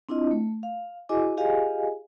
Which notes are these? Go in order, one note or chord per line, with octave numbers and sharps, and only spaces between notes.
C4 D4 E4 F4 D#5
A3
F5
E4 F#4 G#4 D#5 G#5 D6
F4 G4 G#4 D#5 F5 G#5